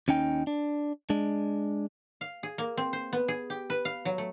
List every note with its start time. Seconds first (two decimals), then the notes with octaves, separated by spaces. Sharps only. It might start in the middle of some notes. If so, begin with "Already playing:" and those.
0.08 D#2 C#4 D#4 G5
0.47 D4
1.10 G#3 D4
2.21 F5
2.43 G#4
2.58 A#3
2.77 C4
2.93 C5
3.13 B3
3.28 G#4
3.50 G4
3.70 B4
3.85 F5
4.05 F#3
4.18 A3